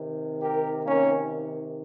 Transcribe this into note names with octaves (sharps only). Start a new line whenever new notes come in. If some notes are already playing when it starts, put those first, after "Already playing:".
Already playing: C3 D#3
G4 A#4
A#3 C#4